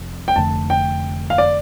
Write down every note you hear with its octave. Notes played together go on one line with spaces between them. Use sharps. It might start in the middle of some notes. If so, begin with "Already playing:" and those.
Already playing: F1 F2
G5
F1 F2 D3 A3 A5
G5
F5
D5